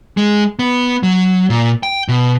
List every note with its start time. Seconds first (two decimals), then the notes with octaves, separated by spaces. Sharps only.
0.17 G#3
0.59 B3
1.03 F#3
1.50 A#2
1.83 G5
2.08 B2